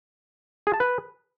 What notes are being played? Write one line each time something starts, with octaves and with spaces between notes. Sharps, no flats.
G#4
A5
B4